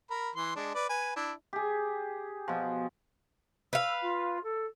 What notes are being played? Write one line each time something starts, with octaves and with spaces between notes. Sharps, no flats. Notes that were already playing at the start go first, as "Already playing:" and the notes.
A#4 B5
E3 C6
G#3 D4
B4 D5
B4 G#5
D4 E4
G4 G#4
B2 F3
B4 F5 E6
F4
A4